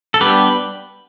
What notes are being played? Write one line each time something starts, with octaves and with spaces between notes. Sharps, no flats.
A4
G3 B3 D4 G4 B4